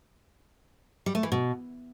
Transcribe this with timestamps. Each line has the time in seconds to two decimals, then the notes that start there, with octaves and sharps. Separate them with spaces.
1.06 G3
1.15 A3
1.23 E3
1.32 B2